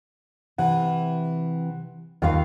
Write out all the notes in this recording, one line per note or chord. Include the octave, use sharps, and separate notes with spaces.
C3 E3 F#5
D#2 F4 A#4 F5